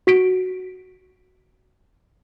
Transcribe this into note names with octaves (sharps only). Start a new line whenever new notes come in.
F#4 B6 D7